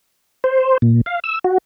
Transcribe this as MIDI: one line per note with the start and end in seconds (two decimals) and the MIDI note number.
0.44 0.77 72
0.82 1.01 46
1.06 1.19 77
1.24 1.39 88
1.44 1.58 66